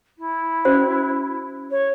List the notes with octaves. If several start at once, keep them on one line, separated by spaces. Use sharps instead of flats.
E4
C#4 F#4 C5
C#5